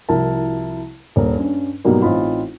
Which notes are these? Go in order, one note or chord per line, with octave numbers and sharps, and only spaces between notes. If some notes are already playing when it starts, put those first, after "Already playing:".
C2 F3 E4 F#4 A#4 A5
D#1 A#3 D4 A#4
G2 C#4
G#2 B2 F#3 G3 A#3
A1 C4 D#4 F4 B5